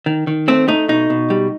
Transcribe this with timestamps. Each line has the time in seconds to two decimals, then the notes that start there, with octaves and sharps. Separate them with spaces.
0.06 D#3
0.27 D#3
0.48 A3 C4
0.68 A3 D#4
0.89 B2 D#4
1.10 B2
1.30 G3